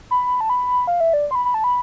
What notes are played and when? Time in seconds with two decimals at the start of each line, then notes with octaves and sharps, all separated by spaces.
0.11 B5
0.41 A5
0.50 B5
0.87 F5
1.00 E5
1.13 D5
1.31 C6
1.35 B5
1.45 B5
1.54 A5
1.64 B5